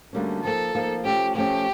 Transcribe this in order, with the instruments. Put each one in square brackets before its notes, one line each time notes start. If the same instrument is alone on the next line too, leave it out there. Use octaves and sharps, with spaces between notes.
[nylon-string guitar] D2 D3 G3 A#3 C#4
[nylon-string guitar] F3 A#3 D#4 [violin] A4
[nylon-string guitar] F3 A#3 D#4
[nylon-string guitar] F3 A3 C#4 [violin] G4
[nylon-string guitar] F3 A3 C#4 [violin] G4